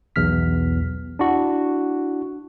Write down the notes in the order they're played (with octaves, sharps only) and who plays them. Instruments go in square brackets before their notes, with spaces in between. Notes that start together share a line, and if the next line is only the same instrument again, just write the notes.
[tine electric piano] B1 E2 F6 B6
D4 E4 F#4